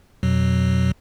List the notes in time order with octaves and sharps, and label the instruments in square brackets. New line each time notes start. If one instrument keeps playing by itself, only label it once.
[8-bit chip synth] F2 B2 F#3